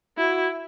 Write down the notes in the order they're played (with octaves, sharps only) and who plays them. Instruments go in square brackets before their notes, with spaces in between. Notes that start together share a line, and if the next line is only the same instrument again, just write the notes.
[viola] E4 [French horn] F#4